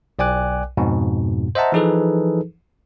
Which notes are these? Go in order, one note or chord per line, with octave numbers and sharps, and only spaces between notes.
B1 D5 G5 G#5 D6 F#6
F2 G#2 B2
C5 D#5 E5 F#5 A5 A#5
E3 F3 D#4 G#4 A4 B4